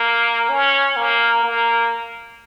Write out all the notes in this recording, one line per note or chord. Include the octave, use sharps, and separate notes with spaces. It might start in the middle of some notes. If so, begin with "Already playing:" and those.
Already playing: A#3
C#4
A#3
A#3